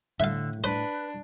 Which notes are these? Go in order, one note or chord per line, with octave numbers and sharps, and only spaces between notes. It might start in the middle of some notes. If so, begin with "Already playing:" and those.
A2 D3 E5 F5
D4 B4 C5